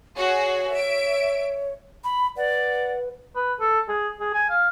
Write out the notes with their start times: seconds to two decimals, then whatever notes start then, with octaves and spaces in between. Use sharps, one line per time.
0.17 F#4 G#4 C#5
0.72 E5 D7
2.04 B5
2.37 B4 D5 F#5
3.35 B4
3.60 A4
3.89 G#4
4.20 G#4
4.34 G#5
4.50 F5